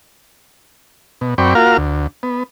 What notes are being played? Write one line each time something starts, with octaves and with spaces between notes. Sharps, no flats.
B2
F#2 C4 D5 G5 B5 C#6
A#3 F4 F#4 A#4 F5 F6
D2
B3